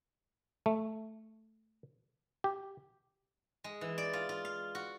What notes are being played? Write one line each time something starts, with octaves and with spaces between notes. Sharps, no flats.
A3
G4
G#3
E3
D5
F4
F4
F5
F#4